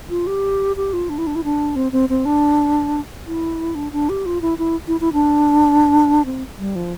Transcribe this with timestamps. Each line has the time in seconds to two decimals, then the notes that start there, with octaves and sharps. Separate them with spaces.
0.10 F4
0.27 G4
0.76 G4
0.93 F4
1.09 D4
1.18 E4
1.27 D4
1.35 E4
1.44 D4
1.76 C4
1.92 C4
2.09 C4
2.25 D4
3.26 E4
3.75 D4
3.92 D4
4.09 G4
4.26 F4
4.42 E4
4.58 E4
4.88 E4
5.01 E4
5.13 D4
6.25 C4
6.59 G3
6.76 F3